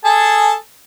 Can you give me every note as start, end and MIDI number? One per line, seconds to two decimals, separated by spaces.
0.05 0.54 68
0.05 0.54 69
0.05 0.54 81